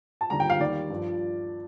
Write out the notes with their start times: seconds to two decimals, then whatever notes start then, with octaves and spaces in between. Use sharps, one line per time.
0.21 A5
0.30 D#2 D3 G3 A#5
0.40 G5
0.50 F5
0.60 D#2 D#3 G3 D5
0.90 G2 F3